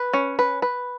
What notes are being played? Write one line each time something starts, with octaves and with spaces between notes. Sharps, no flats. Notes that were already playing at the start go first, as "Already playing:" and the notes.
Already playing: B4
C#4
B4
B4